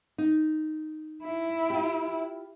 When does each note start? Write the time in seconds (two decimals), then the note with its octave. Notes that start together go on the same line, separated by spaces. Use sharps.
0.18 D#4
1.24 E4
1.70 F4 G4